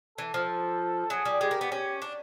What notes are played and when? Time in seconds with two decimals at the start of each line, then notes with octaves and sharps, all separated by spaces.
0.18 E3 A4
0.34 F3
1.10 F#3 G#4
1.25 G3
1.41 G#3 G4
1.51 A#3
1.61 B3
1.71 C#4 G4
2.02 D4